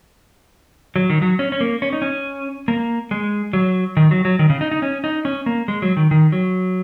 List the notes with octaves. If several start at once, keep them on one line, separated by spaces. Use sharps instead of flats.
F#3
D#3
F#3
C#4
C#4
A#3
C#4
D#4
C#4
A#3
G#3
F#3
D#3
F#3
F#3
D#3
C#3
D#4
D#4
C#4
D#4
C#4
A#3
G#3
F#3
D#3
D#3
F#3